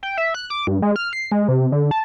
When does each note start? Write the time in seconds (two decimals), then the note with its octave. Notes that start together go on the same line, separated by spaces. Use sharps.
0.03 G5
0.17 E5
0.34 F#6
0.50 D6
0.67 G2
0.82 G#3
0.96 F6
1.13 C7
1.32 G#3
1.48 C3
1.72 D3
1.91 A5